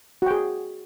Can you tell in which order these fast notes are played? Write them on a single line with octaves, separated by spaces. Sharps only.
F#4 G5 G#4